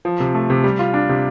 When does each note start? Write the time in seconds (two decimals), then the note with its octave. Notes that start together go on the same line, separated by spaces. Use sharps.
0.05 F3
0.20 C3
0.34 A3
0.50 C3
0.64 G3
0.79 F4
0.94 D4
1.09 C3